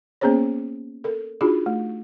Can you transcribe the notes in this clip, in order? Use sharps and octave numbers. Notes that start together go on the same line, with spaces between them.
A#3 B3 C#4 G#4 C5 C#5
A4 A#4
D4 D#4 F4 F#4 G#4
A3